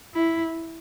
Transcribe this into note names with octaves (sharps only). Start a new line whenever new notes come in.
E4